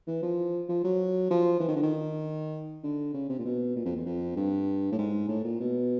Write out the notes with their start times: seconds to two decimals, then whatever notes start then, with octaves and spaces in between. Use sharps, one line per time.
0.07 E3
0.22 F3
0.69 F3
0.84 F#3
1.30 F3
1.60 E3
1.68 D#3
1.76 D3
1.83 D#3
2.84 D3
3.14 C#3
3.29 C3
3.39 A#2
3.45 B2
3.76 A#2
3.85 F2
3.96 E2
4.06 F2
4.36 G2
4.92 A2
4.98 G#2
5.28 A2
5.44 A#2
5.60 B2